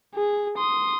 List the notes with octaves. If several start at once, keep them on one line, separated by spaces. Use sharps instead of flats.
G#4
C6 D#6